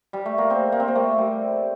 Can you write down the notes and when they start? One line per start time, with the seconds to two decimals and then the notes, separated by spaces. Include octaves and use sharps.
0.13 G3
0.26 A3
0.38 A#3
0.50 C4
0.72 A#3
0.80 C4
0.88 A#3
0.96 A3
1.18 G3